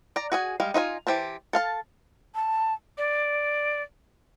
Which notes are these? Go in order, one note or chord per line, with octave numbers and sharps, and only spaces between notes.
D5 A#5
F#4 G#4 G#5
G3 G#3 F5
D#4 F4 D#5 G#5
E3 G4 C5 A5
A4 F5 A5
A5
D5